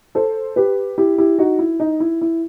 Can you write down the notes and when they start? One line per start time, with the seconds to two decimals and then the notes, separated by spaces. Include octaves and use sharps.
0.15 A4 C5
0.56 G4 B4
0.98 E4 G4
1.18 E4 G4
1.39 D#4 F#4
1.59 E4
1.80 D#4
2.00 E4
2.21 E4